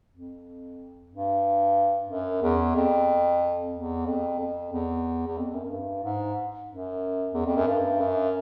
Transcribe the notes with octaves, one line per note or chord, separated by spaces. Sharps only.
F2
G2
F#2
E2
F2
E2
F2
F2
E2
E2
F2
F#2
F#2
G2
G#2
F#2
E2
F2
F#2
G2
F#2